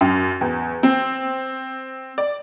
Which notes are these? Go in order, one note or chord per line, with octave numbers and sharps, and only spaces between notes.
F#2
E2
C4
D5